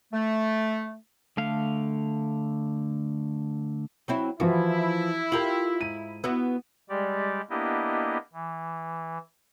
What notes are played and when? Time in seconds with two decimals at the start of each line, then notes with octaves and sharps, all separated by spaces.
0.13 A3
1.37 D3 A3 F5
4.08 F#3 C4 E4
4.40 E3 F3 E4 F#4
5.32 F4 G4 A#4 F#7
5.81 G#2 D#7
6.24 B3 E4 F#4 E6
6.89 G3 G#3 G4 D5
7.50 A#3 B3 D4 E4 G4 D#5
8.33 E3